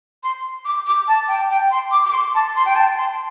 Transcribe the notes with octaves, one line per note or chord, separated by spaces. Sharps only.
C6
D6
D6
A5
G5
G5
C6
D6
D6
C6
A5
C6
G5
A5
C6